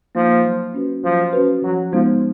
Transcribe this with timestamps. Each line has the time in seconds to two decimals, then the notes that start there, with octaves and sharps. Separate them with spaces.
0.15 F3 A#3 D#4
0.44 F#3
0.74 C#4 F#4 B4
1.04 F3 F#3
1.33 C#4 F#4 B4
1.62 F3 F#3
1.92 F3 G#3 B3 D#4